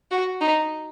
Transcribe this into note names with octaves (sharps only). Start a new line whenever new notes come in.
F#4
D#4